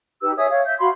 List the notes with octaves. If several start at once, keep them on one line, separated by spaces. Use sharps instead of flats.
D#4 G4 B4 E6
G#4 C#5 E5 D#6
C#5 F5
E5 G6
F#4 F5 B5 C6